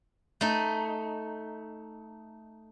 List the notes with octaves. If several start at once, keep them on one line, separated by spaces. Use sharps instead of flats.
A3 D#4